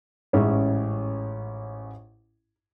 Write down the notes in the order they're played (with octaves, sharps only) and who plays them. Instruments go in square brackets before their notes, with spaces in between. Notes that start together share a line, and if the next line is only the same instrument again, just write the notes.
[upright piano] A1 G#2 C#4 G#4 E5